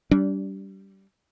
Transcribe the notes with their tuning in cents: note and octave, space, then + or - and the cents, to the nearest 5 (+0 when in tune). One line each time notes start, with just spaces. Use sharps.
G3 -15 D4 -30